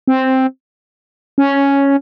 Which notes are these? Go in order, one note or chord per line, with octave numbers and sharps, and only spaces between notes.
C4
C#4